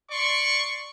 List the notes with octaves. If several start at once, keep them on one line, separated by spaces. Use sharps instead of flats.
D5 C6 C#6